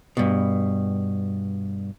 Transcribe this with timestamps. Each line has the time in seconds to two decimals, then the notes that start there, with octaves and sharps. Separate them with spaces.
0.17 G2 B2